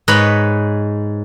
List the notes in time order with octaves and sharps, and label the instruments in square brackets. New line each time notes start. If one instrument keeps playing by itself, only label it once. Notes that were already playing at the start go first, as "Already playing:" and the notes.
[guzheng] G#2 B4 C#5 D#5 B5